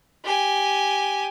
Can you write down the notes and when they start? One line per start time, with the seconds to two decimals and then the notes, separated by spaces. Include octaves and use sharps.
0.25 G4 G#5